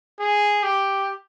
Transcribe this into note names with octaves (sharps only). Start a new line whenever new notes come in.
G#4
G4